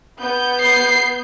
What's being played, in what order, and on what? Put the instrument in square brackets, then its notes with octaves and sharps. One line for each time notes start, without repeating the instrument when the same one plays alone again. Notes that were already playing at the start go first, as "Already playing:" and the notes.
[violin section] B3 G6
[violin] C7